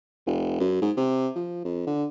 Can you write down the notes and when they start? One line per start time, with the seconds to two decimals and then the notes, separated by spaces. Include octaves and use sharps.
0.26 F1
0.60 F#2
0.81 G#2
0.97 C3
1.36 F3
1.65 F2
1.87 D3